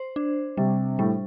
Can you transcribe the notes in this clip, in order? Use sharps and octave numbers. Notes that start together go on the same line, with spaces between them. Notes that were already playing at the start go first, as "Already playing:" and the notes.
Already playing: C5
D4
C3 G3
A2 G3